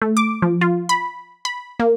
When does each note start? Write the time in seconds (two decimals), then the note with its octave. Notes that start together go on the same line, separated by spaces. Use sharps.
0.02 A3
0.17 D6
0.42 F3
0.61 F4
0.89 B5
1.45 B5
1.79 A#3